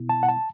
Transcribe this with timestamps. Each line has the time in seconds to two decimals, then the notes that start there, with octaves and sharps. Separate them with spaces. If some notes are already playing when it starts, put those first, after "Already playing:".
Already playing: B2 B3 E4
0.09 A5
0.23 F#5
0.29 A5